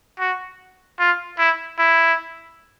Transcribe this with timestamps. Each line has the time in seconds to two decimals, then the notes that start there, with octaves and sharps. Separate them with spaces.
0.19 F#4
0.99 F4
1.38 E4
1.79 E4